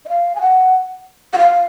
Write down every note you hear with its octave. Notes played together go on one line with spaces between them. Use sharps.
D#5
F5
G#5
F#5
F#5
F5